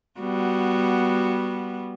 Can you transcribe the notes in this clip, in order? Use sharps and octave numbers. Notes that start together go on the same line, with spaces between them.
G3 B3 F#4